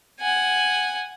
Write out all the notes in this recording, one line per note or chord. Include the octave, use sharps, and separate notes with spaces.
F#5 G#5